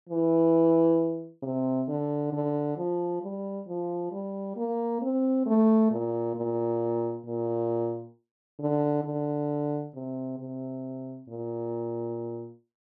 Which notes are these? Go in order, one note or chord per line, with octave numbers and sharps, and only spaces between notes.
E3
C3
D3
D3
F3
G3
F3
G3
A#3
C4
A3
A#2
A#2
A#2
D3
D3
C3
C3
A#2